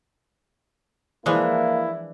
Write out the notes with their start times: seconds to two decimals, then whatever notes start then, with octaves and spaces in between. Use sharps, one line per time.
1.26 E3 F3 G#3 A#3 D4 E4